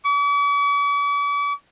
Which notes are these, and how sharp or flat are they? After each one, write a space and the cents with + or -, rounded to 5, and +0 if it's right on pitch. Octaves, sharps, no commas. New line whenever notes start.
D6 -45